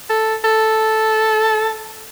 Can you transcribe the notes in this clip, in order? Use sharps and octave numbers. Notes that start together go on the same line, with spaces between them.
A4
A4